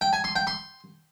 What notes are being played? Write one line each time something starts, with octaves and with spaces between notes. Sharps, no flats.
G5
G#5
C6
G5
C6